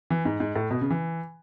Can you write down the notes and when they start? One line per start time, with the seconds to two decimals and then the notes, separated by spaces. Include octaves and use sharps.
0.10 E3
0.25 G#2
0.40 G#2
0.56 A2
0.71 B2
0.81 C#3
0.90 E3